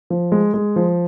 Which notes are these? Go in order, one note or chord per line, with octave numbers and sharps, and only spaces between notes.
F3
G#3
G#3
F3